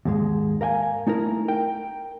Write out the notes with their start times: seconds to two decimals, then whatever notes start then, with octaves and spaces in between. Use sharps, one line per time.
0.05 D#2 G#2 G#3
0.61 A#4 F5 G5 G#5
1.07 A3 D#4 E4 A#4
1.48 A#4 G5